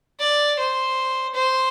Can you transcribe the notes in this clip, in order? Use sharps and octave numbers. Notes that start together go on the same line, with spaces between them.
D5
C5
C5